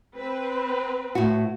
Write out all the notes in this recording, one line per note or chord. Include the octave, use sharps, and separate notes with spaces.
C4 B4
A2 F#4